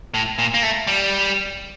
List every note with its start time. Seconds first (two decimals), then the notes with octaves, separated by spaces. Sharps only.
0.14 A2
0.38 A#2
0.54 A#3
0.63 A3
0.87 G3